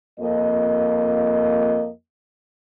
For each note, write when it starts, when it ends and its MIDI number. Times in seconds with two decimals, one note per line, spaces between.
0.20 1.89 41
0.20 1.89 58
0.20 1.89 75